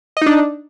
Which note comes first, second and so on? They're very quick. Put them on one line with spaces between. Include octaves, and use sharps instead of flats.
D#5 D#4 D4